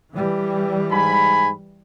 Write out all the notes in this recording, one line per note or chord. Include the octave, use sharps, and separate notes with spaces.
E3 G3
G#2 G#5 B5